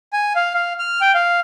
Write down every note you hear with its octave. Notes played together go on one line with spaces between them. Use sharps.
G#5
F5
F5
F6
G5
F5